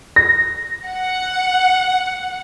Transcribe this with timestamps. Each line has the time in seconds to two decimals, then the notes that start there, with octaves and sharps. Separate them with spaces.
0.16 A#6
0.87 F#5